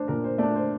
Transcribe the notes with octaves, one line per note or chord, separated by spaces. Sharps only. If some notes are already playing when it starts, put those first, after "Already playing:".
Already playing: A3 D4 C5
A#2 A#4
C5
A3 D4 D5
C5